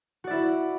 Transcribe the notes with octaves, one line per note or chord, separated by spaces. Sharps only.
E4 F#4 D5